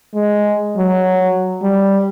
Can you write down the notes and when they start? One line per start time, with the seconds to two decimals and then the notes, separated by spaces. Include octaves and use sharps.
0.15 G#3
0.77 F#3
1.62 G3